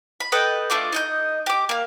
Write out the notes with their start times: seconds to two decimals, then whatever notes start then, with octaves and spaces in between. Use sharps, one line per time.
0.20 B5
0.32 A4 B4 D#5 G5
0.70 A3 D4 F4 D6
0.93 D#4 D#5 G6
1.46 G4 D6
1.69 A#3 F5